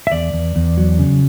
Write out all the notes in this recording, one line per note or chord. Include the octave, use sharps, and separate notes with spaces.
E5
E2 D5
E2
E2
F#3
C#3